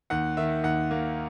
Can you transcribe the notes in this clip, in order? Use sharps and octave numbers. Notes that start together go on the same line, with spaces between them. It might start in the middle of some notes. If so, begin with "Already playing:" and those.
D#2 F#5
D#3 E5
D#2 F#5
A#3